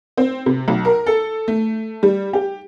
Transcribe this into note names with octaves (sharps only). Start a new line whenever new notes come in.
C4
C3
B1
A#4
A4
A3
G3
G4